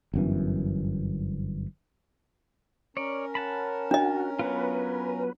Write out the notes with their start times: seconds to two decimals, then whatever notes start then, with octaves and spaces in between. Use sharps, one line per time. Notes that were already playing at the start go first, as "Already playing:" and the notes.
0.14 G1 F#2 E3
2.97 C#4 A#4 C#5 D5
3.35 F#5 A5 B5
3.91 D4 F#4 D#5
4.39 F#3 B3 F4 B4